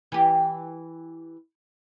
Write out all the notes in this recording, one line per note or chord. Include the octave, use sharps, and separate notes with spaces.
E3 G4